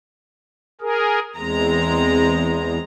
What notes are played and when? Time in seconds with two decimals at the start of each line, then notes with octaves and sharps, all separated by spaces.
0.81 G#4 A#4
1.36 E2 G#3 C4 A#5